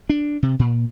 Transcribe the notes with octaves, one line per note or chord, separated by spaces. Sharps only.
D4
C3
A#2